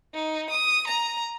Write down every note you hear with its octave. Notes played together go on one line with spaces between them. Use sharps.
D#4
D#6
A#5